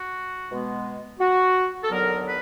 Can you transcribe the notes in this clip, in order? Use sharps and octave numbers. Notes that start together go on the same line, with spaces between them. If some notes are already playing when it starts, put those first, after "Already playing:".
Already playing: F#4
B2 G#3 B3
F#4
A4
D#2 D3 F#3 B3 A#4
B4